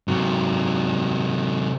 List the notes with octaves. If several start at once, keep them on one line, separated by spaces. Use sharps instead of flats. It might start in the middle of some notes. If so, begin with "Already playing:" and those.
C3 F#3